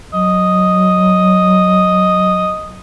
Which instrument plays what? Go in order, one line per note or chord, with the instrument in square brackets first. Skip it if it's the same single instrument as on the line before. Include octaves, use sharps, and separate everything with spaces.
[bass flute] F#3 [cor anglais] D#5